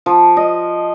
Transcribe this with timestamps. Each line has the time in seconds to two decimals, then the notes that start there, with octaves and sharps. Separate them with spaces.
0.06 F3
0.37 D#5